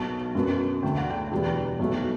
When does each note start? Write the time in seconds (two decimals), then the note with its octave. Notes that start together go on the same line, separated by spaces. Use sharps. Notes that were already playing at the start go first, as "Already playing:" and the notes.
Already playing: B1 B2 F#3 A5
0.35 F#2 F#3 B3
0.83 D2 D3 A3 G5
0.97 F#5
1.10 G5
1.31 E2 B2 G3 B3
1.79 B1 B2 F#3 A3